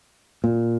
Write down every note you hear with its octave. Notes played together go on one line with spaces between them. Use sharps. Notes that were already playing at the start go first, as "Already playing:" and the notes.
A#2